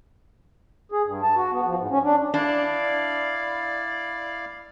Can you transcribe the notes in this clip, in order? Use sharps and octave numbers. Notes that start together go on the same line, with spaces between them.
G#4
G2
A5
F#4
B3
F3
G#2
C#4
D4
D4 E4 D5 F5